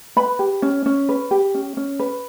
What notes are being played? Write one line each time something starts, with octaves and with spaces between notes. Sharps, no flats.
B4 B5
G4
C#4
C#4
B4
G4
C#4
C#4
B4